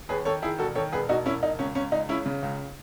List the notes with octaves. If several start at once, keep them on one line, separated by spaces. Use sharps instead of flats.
D#2 G#4 B4
D#3 A4 C#5
D#3 E4 G#4
E1 F#4 A4
D#3 A4 C#5
E1 G#4 B4
E1 D#4 F#4
E1 C#4 E4
E1 D#4
C#2 C#4
C#2 C#4
C#2 D#4
C#3 C#4 E4
C#3
C#2